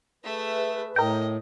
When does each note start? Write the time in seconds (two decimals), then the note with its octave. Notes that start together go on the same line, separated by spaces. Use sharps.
0.24 A3 G#4 B4 E5
0.96 A2 A#4 D#5 G5